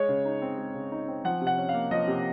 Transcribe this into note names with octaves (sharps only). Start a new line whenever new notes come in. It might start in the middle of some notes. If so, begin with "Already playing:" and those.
Already playing: G#3 C#5
C#3
D#4
C4
G#3
C#3
D#4
C4
F3 F#5
C3
F#5
C#4
F5
A#3
F3 D#5
C3